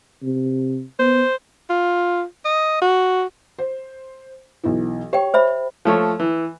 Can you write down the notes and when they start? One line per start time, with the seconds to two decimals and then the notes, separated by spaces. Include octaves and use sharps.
0.23 C3
0.99 B3 C5
1.69 F4
2.45 D#5
2.81 F#4
3.59 C5
4.64 B1 E3
5.13 G4 C#5 G5
5.34 C5 E5 B5
5.85 F3 A3 C#5
6.20 E3